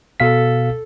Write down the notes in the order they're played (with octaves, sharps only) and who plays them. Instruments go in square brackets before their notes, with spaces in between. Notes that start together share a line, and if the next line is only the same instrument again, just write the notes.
[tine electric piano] B2 F5 B6 [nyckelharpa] A4